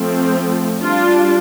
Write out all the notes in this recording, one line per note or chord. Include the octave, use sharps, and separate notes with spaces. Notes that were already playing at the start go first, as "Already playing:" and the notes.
Already playing: F3 A3 C4
G3 D4 F4